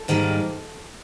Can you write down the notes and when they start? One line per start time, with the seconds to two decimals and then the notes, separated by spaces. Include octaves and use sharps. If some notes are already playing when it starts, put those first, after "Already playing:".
Already playing: A4
0.08 G#2 D#3 G3 A#3